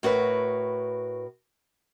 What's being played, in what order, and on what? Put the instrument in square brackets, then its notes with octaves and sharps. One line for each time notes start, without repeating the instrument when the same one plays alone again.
[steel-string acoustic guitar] A2 F#4 A#4 B4